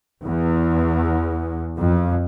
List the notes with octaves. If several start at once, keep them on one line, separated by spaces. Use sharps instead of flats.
E2
F2